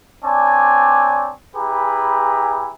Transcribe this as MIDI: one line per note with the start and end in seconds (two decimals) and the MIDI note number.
0.24 1.32 60
0.24 1.32 62
0.24 1.32 73
0.24 1.32 74
0.24 1.32 80
0.24 1.32 81
1.56 2.72 64
1.56 2.72 67
1.56 2.72 68
1.56 2.72 71
1.56 2.72 80
1.56 2.72 82